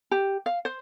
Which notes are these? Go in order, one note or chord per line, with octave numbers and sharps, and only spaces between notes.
G4
F5
C5